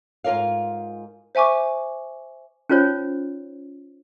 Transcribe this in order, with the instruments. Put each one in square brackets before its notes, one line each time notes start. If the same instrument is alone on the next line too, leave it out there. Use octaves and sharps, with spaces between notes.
[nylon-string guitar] G#2 F4 A#4 D5 F5
[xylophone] C5 E5 G#5 C#6 D6
[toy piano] C#4 D#4 F4 C5 C#5